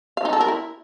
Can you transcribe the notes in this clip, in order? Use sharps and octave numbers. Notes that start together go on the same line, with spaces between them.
F5
D#4
A4
A#4
E4